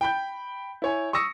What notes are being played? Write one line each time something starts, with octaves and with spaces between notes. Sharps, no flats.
G5 B5 G6
E4 C#5 G#5
C#6 D#6 E6 A#6 C#7